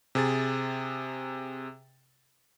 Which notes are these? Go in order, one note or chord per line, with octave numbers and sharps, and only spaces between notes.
C3 G#4 A6